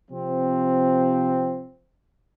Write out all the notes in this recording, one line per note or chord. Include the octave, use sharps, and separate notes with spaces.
C3 F3 C4